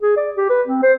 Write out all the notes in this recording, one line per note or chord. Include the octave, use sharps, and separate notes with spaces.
G#4
D5
G4
B4
C4
C5